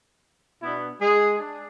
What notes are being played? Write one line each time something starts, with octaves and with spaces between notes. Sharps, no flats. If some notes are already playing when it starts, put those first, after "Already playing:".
B2 B3 D4 E4
G#3 G#4
D4